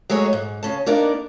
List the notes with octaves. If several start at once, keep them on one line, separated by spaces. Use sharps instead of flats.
F#3 G#3 A3 F#4 G#4 C#5
G#2
C#3 C#4 A5
A#3 B3 D4 D#4 A#4 D5